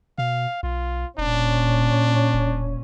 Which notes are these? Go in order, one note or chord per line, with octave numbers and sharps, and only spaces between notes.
B2 F5
B1 F4
E1 A#2 C#4 D4
E1